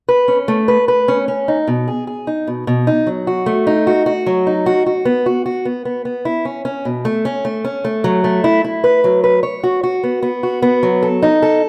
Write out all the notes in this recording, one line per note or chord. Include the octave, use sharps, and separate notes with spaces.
B4
C#4
A3
B4
B4
C#4
C#4
D#4
B2
G#4
G#4
D#4
B2
B2
D#4
F#3
F#4
A3
D#4
F#4
F#4
F#3
D#4
F#4
F#4
B3
F#4
F#4
B3
B3
B3
E4
C#4
C#4
B2
A3
C#4
A3
C#4
A3
F#3
A3
E4
E4
B4
F#3
B4
C#5
F#4
F#4
B3
B3
F#4
B3
F#3
A4
D#4
A4